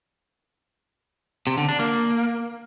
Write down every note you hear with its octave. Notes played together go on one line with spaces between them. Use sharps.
C3
D3
D4
A#3